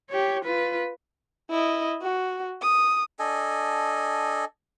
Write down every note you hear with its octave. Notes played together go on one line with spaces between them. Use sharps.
G4 C#5
F4 B4
E4 D#5
F#4
D#6
D4 A4 D#5 G#5